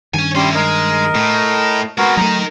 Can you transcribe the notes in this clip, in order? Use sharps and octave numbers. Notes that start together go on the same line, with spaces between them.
G2 D#3 C#5 G#5
G3 C#4 E4 C6
G#3 A#4 D#5
A2 A3
G#3 B3 C4 F#4 A#4
F#3 A3 D#4 A#4 A#5